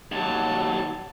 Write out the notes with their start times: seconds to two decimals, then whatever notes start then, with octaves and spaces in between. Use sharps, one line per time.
0.12 D#2 F#3 A5